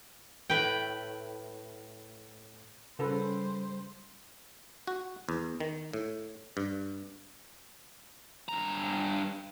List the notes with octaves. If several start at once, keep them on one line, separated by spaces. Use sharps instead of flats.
A2 B4 G5
C#3 G3 A4 B4 C5
F#4
E2
D#3
A2
G2
G2 A#5